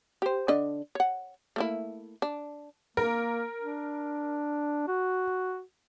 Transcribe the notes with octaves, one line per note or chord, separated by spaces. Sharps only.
G4 C5
D3 D4 D#5
C#5 F#5
A3 A#3 E4
D4
A#3 A#4
D4
F#4